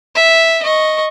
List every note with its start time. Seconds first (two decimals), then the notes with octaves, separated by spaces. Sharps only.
0.15 E5
0.62 D#5 C#6